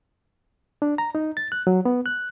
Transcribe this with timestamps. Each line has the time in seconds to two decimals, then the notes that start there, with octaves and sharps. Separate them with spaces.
0.82 D4
0.98 A#5
1.15 D#4
1.37 A6
1.52 F#6
1.67 F#3
1.85 B3
2.06 F#6